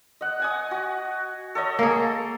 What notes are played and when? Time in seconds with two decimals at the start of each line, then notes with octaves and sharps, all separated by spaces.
0.21 D#5 F#5
0.40 F#5 G#5 D#6
0.71 F#4
1.55 A4 C#5 D#5
1.79 A#3 G#4